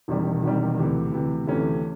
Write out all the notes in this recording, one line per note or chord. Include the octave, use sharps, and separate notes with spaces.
E1 E2 C3 D#3 G3
E1 E2 C3 D#3 G3
D2 C3 E3
D2 C3 E3
D2 C3 E3 A3 C#4